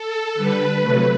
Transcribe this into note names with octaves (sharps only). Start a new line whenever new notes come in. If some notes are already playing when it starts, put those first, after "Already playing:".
Already playing: A4
D3 G3 B4
C3 F#3 A3